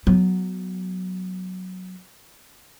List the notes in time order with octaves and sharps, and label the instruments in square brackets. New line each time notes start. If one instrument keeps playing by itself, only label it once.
[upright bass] F#3 B3